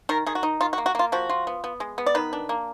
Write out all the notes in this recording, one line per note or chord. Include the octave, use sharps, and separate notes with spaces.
D#3 A#4
D#3 G#4
F#4
D#4
D#3 F4
F#4
A#3
F#4
A#3 F4
F3 F#4
F4
B3
B3
G#3
B3
D5
D#3 B4
D4
A#3